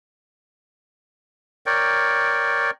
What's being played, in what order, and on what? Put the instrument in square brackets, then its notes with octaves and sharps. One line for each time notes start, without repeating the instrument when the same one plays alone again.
[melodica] A#4 C#5 D5 G5